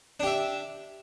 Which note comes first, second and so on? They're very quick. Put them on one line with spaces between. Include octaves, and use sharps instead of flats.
D4 G4 E5